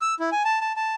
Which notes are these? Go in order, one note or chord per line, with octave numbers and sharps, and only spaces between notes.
E6
E4
G#5
A5
A5
A5